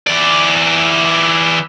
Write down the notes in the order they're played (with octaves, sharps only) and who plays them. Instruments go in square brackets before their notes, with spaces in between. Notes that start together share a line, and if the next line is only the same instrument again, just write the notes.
[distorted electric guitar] E3 D5